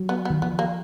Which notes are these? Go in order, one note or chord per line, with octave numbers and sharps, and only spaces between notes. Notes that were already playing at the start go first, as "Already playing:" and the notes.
Already playing: F#3
B3
B3
D#3
F3 B3
A#3